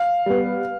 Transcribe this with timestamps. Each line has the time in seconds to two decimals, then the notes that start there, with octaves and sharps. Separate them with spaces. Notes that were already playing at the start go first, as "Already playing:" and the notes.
Already playing: F5
0.26 G3 B3